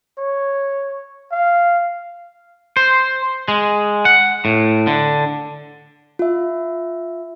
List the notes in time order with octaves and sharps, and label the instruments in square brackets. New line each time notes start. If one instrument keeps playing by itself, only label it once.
[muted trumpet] C#5
F5
[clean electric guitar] C5
G#3
F#5
A2
D3
[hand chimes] F4 E5